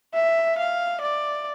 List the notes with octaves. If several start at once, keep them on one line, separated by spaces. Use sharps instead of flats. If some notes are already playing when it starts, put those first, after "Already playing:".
E5
F5
D5